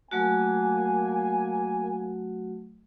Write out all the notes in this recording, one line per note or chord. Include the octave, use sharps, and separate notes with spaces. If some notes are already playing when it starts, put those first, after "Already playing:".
F#3 A3 A#3 F#4 G#5